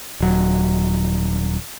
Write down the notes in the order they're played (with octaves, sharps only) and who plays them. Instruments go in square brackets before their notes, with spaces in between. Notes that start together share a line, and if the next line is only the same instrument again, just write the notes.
[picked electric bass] D#1 F#3